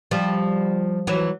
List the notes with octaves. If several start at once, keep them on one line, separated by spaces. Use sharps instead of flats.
F3 G3
E3 F#3